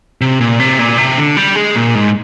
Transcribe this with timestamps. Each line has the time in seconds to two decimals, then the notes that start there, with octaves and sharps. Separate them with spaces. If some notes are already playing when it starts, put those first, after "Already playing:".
0.21 C3
0.40 A#2
0.60 C3
0.79 A#2
0.98 C3
1.18 D3
1.37 G3
1.56 G#3
1.75 A#2
1.95 G#2